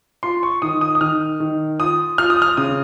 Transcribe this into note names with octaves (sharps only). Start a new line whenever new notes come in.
F4 C6
C#6
D#3 D#6
D#6
D#6
D#3 F6
D#3
F4 D#6
F4 F6
D#6
F6
C#3 D#6